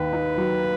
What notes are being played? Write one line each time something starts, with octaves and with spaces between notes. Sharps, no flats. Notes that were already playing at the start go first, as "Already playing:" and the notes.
Already playing: D#2 D#3 B4
D#4
F#3